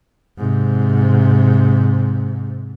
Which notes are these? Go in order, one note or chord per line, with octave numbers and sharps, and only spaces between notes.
G#2 C3